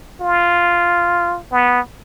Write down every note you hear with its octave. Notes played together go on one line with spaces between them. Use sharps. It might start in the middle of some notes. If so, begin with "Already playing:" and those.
F4
B3